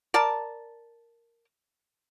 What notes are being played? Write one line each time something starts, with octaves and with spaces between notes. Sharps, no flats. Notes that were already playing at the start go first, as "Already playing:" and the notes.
A#4 D5 A5